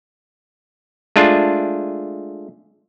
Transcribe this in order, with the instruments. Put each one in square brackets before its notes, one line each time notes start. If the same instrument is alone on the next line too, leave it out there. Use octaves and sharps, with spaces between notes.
[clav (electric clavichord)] G#3 A3 D4 F4